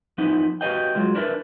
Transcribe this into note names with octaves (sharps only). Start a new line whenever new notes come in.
F3 B3 D#4 E4
F#4 G4 B4 D#5 F5 G5
F#3 G#3 F4
D4 E4 A#4 B4 D5 E5